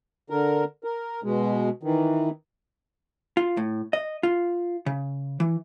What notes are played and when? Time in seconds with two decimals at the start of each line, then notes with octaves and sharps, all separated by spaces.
0.30 D3 A#4
0.84 A#4
1.24 B2 G#3
1.83 D#3 E3
3.37 F4
3.57 A2
3.93 D#5
4.23 F4
4.86 C#3
5.40 E3